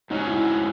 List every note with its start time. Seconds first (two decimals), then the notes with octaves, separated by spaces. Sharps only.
0.10 G#2 F#3 C#4 D#4
0.28 E4